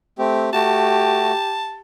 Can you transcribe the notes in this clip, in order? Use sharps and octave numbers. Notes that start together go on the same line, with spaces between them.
A3 C4 G4
A3 F#4 G4 A5